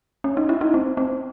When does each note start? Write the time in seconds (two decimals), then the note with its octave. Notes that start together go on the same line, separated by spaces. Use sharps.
0.24 C#4
0.37 D#4
0.49 E4
0.61 D#4
0.74 C4
0.97 C4